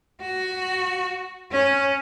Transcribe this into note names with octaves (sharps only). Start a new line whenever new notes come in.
F#4
C#4